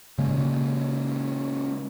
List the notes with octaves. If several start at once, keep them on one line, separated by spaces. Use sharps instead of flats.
C#3 G#3 A#3